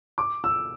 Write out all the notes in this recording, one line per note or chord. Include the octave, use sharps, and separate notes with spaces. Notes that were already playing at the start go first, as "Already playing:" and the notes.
D6
E6